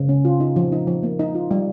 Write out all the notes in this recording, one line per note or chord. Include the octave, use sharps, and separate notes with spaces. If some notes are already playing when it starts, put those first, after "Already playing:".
Already playing: C#3
C#4
F4
D#4
F3
D#4
F3
A#3
D#4
F4
G3